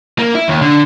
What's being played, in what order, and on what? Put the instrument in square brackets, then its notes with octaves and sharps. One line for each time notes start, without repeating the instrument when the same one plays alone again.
[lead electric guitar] A#3
E4
D#2
D3